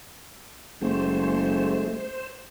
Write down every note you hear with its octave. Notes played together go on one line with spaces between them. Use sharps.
F#1 G#3 A3 C5
C5